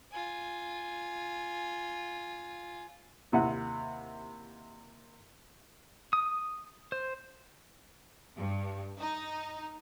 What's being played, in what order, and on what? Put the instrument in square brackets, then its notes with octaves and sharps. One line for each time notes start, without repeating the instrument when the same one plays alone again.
[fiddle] F4 G#5
[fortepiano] D#2 C3 E4 F#5
[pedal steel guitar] D#6
C5
[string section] G2
D#4